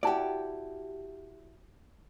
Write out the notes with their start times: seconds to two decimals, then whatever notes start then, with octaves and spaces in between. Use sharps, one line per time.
0.03 E4 F#4 G4 D5 A5